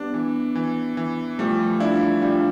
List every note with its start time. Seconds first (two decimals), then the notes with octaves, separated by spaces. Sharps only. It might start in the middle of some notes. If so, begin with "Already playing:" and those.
Already playing: G3 B3 D4
0.14 E3
0.55 E3
0.97 E3
1.38 F3 G3 A3
1.80 D4 E4 F4
2.22 G3 D4 F4